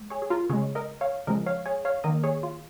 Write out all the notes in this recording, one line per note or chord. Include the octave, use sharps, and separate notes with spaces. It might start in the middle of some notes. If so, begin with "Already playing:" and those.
Already playing: G#3
G#4 C#5
G#4
F4 A#4
C#3 G#3 G#4 C#5
A#4 D#5
C#5 F5
C#3 F3 G#3 A#4 D#5
C#5 F5
G#4 C#5
C#5 F5
D#3 A#3 A#4 D#5
G#4 C#5
F4